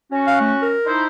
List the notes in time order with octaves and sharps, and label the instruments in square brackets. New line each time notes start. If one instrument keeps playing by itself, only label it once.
[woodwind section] C#4 F#4
[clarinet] F5
A3
A#4
[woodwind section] D#4 E4 C5